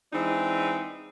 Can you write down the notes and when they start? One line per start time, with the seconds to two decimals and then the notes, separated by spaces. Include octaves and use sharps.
0.12 E3 G#3 C4 D4 D#4